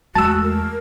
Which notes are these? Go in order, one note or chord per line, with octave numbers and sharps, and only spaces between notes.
E2 G#3 A3 F#4 A5 E6
A#4